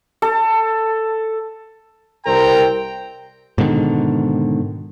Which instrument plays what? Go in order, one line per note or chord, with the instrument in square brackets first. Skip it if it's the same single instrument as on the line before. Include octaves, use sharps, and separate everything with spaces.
[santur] A4
[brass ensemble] C2 C4 A#4 G5 A#5
[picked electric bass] G#2 B2 D3 D#3